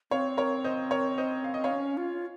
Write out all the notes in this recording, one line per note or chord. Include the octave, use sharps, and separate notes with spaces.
C4 C#5 F5
A#4 C#5
C5 D#5
A#4 C#5
C5 D#5
F5
D#5
C#5 F5
C#4
F4